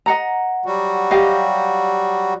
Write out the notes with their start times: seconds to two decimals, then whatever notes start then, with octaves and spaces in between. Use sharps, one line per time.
0.06 D#5 F#5 A#5
0.66 F#3 G3 F#4
1.11 G4 D#5 F5